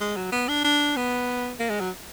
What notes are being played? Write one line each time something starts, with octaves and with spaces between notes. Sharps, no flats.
G#3
F#3
B3
D4
D4
B3
A#3
G#3
F#3